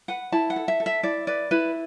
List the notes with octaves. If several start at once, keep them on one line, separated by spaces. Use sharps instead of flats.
B4 F#5
E4 A5
F#5
A4
E5
A4
E5
E4 D5
B4 D5
E4 B4